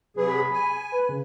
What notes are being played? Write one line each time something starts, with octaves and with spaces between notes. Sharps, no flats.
C3 F#3 G#4 B4
B5
G#5
B4
C#3